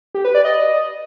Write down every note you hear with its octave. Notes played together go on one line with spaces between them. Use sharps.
G4
B4
D5
D#5